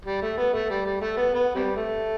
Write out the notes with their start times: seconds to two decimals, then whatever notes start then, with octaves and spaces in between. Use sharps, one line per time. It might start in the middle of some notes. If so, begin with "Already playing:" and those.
0.05 G3
0.22 A3
0.38 B3
0.53 A3
0.70 G3
0.86 G3
1.01 A3
1.17 B3
1.34 B3
1.55 C3 G3
1.77 A3